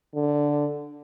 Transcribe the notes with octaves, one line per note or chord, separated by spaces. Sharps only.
D3